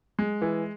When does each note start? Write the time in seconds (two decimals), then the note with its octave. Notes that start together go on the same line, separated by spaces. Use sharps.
0.19 G#3
0.42 E3